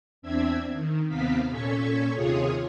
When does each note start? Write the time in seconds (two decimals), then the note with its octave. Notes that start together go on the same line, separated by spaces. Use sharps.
0.22 E2 C4 D4 E5 E6 G#6
0.73 D#3
1.08 D#2 C3 B3 C4 F5 B6
1.49 A#2 C#4 A4 C#6 G#6 B6
2.14 D#2 C3 F4 G#4 C#5 D#6